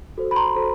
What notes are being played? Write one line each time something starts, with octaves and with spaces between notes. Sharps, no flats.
F#4 A4 C5
B5
A#5 C6
F#4 A4 C5